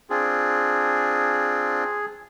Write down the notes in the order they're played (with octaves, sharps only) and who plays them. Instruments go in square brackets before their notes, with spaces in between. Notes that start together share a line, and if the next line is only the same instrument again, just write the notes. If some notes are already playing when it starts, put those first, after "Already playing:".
[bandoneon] C4 D4 F4 [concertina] G#4